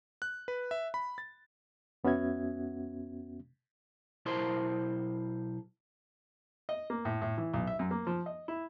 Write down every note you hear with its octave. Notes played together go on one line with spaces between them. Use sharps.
F#6
B4
E5
B5
A6
F2 B3 C#4 F#4 E5 G#6
B1 E4 A#4 C5 A5 C6
D#5
A#3
A2
A2
E3
B1
E5
F#2
A#3
F3
D#5
E4